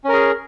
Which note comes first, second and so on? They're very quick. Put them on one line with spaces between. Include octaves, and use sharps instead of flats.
C#4 A#4 G#4